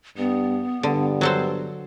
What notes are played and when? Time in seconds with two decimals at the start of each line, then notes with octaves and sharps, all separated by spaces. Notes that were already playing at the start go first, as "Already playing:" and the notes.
0.18 G2 B3
0.83 G2 D3
1.21 F#3 A4 C5